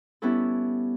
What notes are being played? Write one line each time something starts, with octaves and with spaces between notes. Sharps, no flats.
G3 B3 C#4 E4 A4